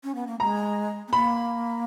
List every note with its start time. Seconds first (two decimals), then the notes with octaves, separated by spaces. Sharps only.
0.04 C#4
0.15 B3
0.27 A#3
0.40 G#3 A#5
1.08 B3
1.13 A#3 B5